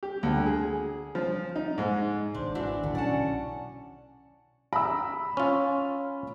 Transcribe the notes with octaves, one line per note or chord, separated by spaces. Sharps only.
G4
D2
G#4
F3
D#4
G#2
G#1 B2 D4 C5
E3 D4 E4 F#4
G1 D#2 D3
B1 A#2 D3 C#4 D5 F#5 A5
A#5 B5 E6
C#4 F4